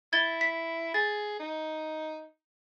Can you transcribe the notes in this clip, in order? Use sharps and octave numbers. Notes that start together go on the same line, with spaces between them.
E4 G#6 A6 G7
B6
G#4 A6
D#4